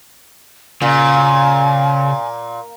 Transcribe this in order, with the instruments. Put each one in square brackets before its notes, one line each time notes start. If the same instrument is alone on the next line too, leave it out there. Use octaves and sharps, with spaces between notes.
[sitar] A#2 [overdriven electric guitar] C#3 [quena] G#5